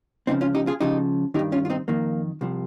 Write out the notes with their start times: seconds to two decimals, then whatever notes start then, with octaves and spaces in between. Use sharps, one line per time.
0.27 C#2 C#3 F3 C4 D#4
0.41 C#4 F4
0.55 D#4 G4
0.67 F4 G#4
0.80 C#2 C#3 F3 D#4 G4
1.34 D#3 D#4 G4
1.39 G2
1.52 C#4 F4
1.65 F4
1.70 C4 D#4
1.88 F2 D#3 A#3
2.41 C2 C3 F3